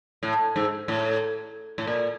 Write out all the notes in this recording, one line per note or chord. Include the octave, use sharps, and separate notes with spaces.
A2
G#2
A2
A2
A#2